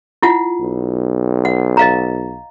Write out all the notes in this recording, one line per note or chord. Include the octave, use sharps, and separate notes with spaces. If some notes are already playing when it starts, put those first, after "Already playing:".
E4 F4 F#5
B1
F#5
D#5 F5 A#5